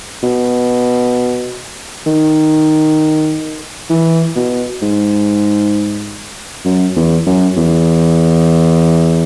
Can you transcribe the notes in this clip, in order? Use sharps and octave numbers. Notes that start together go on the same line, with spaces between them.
B2
D#3
E3
B2
G#2
F#2
E2
F#2
E2